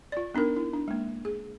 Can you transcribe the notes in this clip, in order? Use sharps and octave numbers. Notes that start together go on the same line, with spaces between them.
F4 D5
B3 D4 D#4 A#4
E4
D4
G#3 A#3
G#4